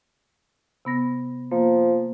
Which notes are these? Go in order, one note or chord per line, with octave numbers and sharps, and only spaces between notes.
C3 B3 A#6
F3 A#3